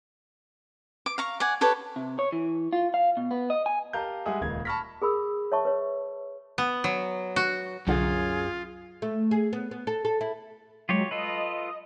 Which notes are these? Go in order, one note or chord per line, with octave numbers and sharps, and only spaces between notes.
D6
F5 A#5 C#6
D5 F#5 G#5
G4 A4 B4 C#5
C3
C#5
E3
F4
F5
B2
B3
D#5
G#5
G4 A#4 F5 A5 A#5 G6
G3 G#3 G#4 E5 F#5 D#6
D#1 C#2 A#3 F5 G#6
A5 B5 C#6 F6 A#6 B6
G#4 A#4 B5 E6
C#5 E5 A5 C#6
B4 C#5
B3
F#3
F#4
C2 F#2 D3 F4 G#4
A3
G#4
B3
B3
A4
A4
E4
F#3 G#3 F4 G4 C#5
F4 A4 B4 D#5